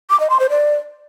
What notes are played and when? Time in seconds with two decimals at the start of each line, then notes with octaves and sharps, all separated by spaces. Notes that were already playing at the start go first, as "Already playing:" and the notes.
0.10 D6
0.20 D#5
0.30 C6
0.40 C5
0.50 D5